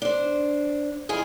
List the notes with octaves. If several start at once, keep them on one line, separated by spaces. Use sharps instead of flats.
D4 C5
F2 E4 F4 G#4